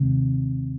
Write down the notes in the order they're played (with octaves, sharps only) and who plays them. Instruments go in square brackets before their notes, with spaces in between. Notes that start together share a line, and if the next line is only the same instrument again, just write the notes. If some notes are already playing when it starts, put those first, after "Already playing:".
Already playing: [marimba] D#2 D#3 G#3 [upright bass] C3